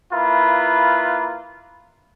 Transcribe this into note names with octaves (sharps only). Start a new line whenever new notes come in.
A#3 E4 F4 B4